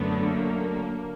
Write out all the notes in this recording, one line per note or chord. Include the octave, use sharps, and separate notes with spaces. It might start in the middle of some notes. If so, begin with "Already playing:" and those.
Already playing: F#2 D3 F#3 A3 B3
A#3